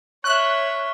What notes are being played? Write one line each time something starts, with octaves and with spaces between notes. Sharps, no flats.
C#5 E5 C#6 F6 F#6